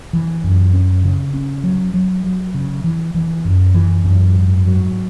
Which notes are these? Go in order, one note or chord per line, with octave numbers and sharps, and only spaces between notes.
E3
F#2
C#4
C#3
C#4
F#3
F#3
F#3
C#3
E3
E3
F#2
E3
F#2
G#2
F#3